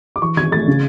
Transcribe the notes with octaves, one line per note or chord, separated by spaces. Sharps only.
D6
E3 C#6
G#1 G#6
A3 A6
C#3